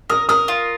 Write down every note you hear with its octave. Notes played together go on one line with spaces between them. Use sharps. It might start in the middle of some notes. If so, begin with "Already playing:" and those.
A#4 D#6
A#4 D#6
F4